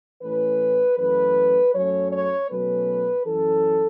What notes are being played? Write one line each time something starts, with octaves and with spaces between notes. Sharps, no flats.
A2 E3 A3 C#4 B4
F#2 E3 A3 B4
F#2 F#3 A3 C#4 C#5
C#5
B2 F#3 A3 C#4 B4
F#2 E3 C#4 A4